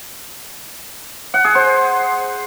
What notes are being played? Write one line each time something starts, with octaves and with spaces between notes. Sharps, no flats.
F#5
G#4
C5